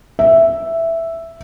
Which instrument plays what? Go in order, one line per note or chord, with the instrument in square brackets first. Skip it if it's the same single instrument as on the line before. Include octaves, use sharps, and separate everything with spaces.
[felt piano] E5